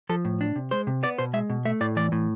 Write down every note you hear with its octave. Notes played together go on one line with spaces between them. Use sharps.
F3 A4
A2
D4
C3
G#3 C5
C3
B3 D5
B2 C5
G#3 E5
B2
A3 E5
A2 D5
E3 D5
A2